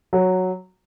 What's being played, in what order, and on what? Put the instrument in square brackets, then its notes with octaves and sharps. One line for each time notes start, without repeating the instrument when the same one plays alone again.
[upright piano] F#3